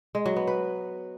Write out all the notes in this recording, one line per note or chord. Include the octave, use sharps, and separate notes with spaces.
G#3
F#3
B3
B4